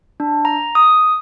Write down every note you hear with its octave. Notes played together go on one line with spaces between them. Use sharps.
D4
A#5
D#6